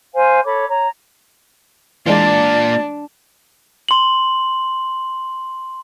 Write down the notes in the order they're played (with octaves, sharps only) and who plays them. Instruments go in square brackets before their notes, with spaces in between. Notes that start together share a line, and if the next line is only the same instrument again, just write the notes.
[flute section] C5 F5 G#5
A4 C#5 B5 D6
C#5 A#5
[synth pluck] E3 G#3 [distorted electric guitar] A#3 F4 [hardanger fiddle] D4 [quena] D5
[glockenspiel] C6 F#7